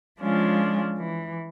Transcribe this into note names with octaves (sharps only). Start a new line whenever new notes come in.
F3 G#3 C#4 D4 F4
E3